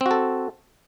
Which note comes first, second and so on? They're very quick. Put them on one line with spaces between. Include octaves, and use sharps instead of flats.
C4 F#4 A4